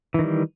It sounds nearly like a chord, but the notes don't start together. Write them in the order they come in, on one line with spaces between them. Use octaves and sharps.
E3 D#3 G3